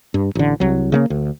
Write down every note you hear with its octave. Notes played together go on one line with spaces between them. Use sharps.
G2
A1 D3
C2 F#3
C#3 A3 A#3
D2